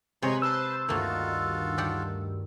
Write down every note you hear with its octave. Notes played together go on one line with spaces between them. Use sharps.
C3 G#3 B4 C#5 G#5 A#5 C6 C#6
B4 C5 A5 E6
D2 G2 D#3 A3 A#3 F4 F#4 A4
D4 G4 F#5